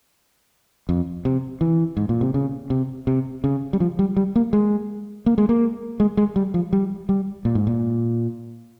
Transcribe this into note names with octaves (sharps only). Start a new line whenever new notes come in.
F2
C3
E3
G#2
A#2
C3
C#3
C3
C3
C#3
G3
F3
G3
G3
A#3
G#3
A#3
G#3
A#3
G#3
G#3
G3
F3
G3
G3
A#2
G#2
A#2